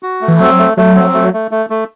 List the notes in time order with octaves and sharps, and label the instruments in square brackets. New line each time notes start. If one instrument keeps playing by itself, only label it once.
[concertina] F#4
A3
[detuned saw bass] E3
[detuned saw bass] F#3 [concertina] C4
[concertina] A3
[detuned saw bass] F#3 [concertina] A3
[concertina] C4
A3
A3
A3
A3